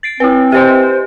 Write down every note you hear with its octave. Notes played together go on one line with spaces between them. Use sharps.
A6 C7 D7
C4 E4 B4
G4 B4 C5 D#5